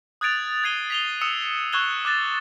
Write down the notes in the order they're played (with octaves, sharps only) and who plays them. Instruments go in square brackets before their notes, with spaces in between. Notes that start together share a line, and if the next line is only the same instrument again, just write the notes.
[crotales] D#6 F#6 G#6 A6 D7 F7
G#6 A6 C7 D#7 G7
B6 F7 G7
D#6 E6 C#7 E7
C#6 E6 F#6 G#6 E7 G7
D6 F#6 A6